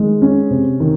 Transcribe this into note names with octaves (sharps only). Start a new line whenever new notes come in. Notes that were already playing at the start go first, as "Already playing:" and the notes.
Already playing: D#3 G#3
C#4
C3
D#3